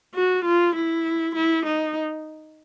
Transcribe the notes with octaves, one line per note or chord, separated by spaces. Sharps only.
F#4
F4
E4
E4
D#4